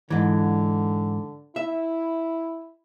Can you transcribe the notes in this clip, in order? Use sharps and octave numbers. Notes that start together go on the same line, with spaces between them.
G#2 D3 E3
E4 E5